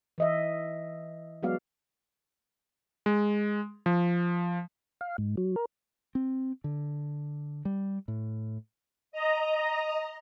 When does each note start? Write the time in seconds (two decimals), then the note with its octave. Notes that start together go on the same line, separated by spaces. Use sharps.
0.18 E3 D#5 E5
1.43 F#3 G#3 B3 F#4 D5 F5
3.06 G#3
3.86 F3
5.01 F5
5.18 G#2
5.37 F#3
5.56 A#4
6.15 C4
6.64 D3
7.65 G3
8.08 A2
9.12 D#5 A#5